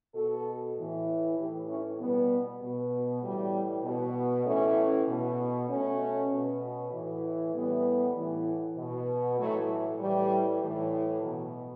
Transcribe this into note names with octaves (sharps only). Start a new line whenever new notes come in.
B2 F#4 A4
A2 E3
A2 E3 E4 G4
C#4 E4
B2 G3 B3
B2
A2 E3 G3
B2
A2 E3 A3 C#4
B2
B2 A3 C#4
B2
A2 E3
A2 E3 G3 B3
A2 E3
B2
A2 E3 F#3 A3
A2 E3 G3
A2 E3
B2 F#3